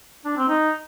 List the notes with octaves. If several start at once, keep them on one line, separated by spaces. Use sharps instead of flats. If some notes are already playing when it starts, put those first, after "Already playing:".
D4
C4
D#4